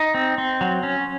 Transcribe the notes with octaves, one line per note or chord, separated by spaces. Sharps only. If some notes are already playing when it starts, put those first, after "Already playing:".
Already playing: D#4
C4
C4
F#3
C#4